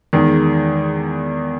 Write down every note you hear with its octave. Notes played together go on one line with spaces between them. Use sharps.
E2 D#3 G#3